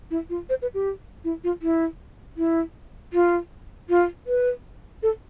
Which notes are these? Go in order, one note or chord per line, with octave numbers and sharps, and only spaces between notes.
E4
F4
C5
B4
G4
E4
F4
E4
E4
F4
F4
B4
A4